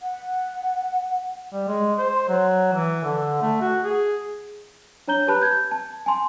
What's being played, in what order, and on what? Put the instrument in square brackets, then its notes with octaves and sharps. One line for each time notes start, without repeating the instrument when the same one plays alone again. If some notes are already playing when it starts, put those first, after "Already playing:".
[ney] F#5
[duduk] G3
G#3
C5
F#3
E3
D3
A3
F#4
G#4
[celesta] D4 C#5 A#5 G6 G7
G4 B4 A5 B5 F#6
G6 G#6
A5
G#5 A5 C6